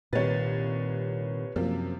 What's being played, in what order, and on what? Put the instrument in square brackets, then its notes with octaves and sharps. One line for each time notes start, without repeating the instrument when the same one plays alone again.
[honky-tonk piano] C2 A6 [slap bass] A#2 D#3 [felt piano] B4 C#5
[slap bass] F#2 [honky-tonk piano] C3 F3 A#3